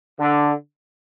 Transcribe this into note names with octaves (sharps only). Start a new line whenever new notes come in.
D3